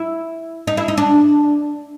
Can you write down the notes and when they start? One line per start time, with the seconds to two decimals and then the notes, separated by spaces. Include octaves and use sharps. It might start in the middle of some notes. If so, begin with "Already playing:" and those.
Already playing: E4
0.67 D#4
0.77 E4
0.88 D#4
0.98 D4